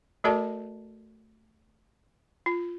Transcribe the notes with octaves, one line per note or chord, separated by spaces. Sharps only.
A3 F#4 A4 A#4 D5 A5
F4